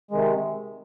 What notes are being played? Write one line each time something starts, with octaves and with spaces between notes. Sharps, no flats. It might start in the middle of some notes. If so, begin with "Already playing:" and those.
C3 D#3 G#3